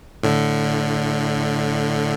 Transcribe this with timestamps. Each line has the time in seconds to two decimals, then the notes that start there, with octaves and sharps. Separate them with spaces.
0.23 A2 D3